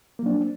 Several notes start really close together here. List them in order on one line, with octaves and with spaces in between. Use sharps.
A#3 F#3 D4 C4